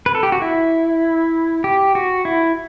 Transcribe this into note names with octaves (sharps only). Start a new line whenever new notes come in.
B4
A4
G4
F#4
E4
G4
F#4
E4